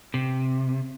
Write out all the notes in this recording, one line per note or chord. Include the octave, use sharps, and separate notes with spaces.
C3